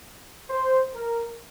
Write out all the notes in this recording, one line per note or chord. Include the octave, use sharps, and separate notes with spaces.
C5
A#4